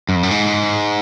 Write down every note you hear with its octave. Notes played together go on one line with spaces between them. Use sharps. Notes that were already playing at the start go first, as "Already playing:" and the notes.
F#2
F2
F#2
G#2